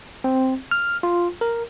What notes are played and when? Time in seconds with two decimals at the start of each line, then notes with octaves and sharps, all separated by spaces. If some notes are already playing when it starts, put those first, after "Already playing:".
0.24 C4
0.71 F6
1.03 F4
1.41 A#4